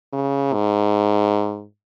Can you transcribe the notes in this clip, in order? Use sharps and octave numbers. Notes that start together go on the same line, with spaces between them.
C#3
G#2